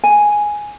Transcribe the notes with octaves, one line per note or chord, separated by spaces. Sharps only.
G#5